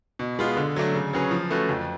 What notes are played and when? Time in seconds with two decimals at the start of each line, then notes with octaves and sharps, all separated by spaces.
0.19 B2
0.39 G#3 B3 F4
0.57 D3
0.76 F#3 A3 D4
0.95 C#3
1.13 F#3 C#4 G#4 B4
1.31 F3
1.50 A3 C#4 F#4 B4
1.69 F2